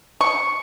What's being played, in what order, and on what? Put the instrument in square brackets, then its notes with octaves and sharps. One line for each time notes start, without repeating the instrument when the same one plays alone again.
[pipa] C#6